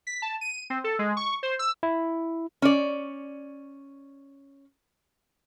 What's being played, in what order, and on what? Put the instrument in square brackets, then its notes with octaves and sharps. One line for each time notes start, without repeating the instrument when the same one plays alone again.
[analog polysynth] B6
A5
D#7
C4
A4
G#3
C#6
C5
E6
[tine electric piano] E4
[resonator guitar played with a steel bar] C#4 D5